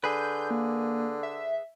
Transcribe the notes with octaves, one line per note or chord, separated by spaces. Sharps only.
D3 G#4 B4 G6
A#3
E5